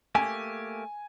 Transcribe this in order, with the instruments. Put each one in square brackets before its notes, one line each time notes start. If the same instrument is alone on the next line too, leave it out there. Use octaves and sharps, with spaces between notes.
[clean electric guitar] A3 A#3 G4 [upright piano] G#5